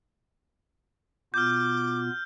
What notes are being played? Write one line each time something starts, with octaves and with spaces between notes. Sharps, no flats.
B2 B3 F4 D6 F6 G6